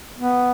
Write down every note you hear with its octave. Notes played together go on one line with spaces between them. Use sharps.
B3